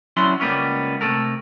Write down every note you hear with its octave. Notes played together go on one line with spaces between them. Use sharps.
F#3 C#4 D4 E4 C6
C#2 G3 A#3 B3 C#4
C3 A3 A4 A#4